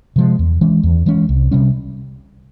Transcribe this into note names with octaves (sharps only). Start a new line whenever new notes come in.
C3 F3 G#3
E2
E3 G#3 C#4
E2
E3 G#3 C#4
C2
C3 G3 C#4